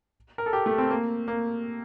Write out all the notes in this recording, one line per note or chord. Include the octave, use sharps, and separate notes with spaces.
A#4
A4
G4
A3
C4
A#3
A#3